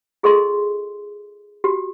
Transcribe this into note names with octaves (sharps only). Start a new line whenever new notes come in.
F4 G#4 A4 D#5 C6
F#4 G4